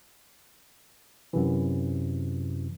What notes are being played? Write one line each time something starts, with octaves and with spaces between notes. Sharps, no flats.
F#2 C3 E3